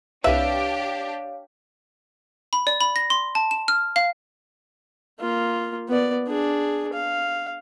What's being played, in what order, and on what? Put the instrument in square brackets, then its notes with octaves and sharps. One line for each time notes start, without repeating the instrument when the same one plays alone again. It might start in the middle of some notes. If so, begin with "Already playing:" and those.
[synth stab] C2 B4 [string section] D4 G4 [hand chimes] C#5 F5 [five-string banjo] E5
[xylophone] B5
D5
B5
A#6
C6
A5
E7
F6
F5
[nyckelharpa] A#3 F4
B3 D5
D4 G#4
F5